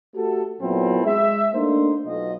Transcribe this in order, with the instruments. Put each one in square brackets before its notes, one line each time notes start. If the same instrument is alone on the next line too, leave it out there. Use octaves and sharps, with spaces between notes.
[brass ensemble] A3 F#4 G4 A4
A#2 F#3 B3 C4 E4 A4
G#3 E5
A3 A#3 D4 D#4 C5
B1 F4 D#5